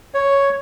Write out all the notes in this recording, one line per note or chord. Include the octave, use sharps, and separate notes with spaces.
C#5